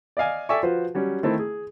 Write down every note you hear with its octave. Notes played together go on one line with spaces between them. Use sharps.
D5 D#5 F5 G#5
A4 D5 E5 G5 G#5 C#6
F3 F4 F#4 B4 C5
F#3 G3 C#4
D#3 A3 C4 E4
G#4